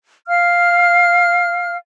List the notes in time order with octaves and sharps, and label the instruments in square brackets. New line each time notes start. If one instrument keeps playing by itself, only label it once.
[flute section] F5 F6